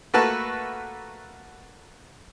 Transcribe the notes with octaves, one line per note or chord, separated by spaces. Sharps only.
A3 A#3 F#4 B4 A5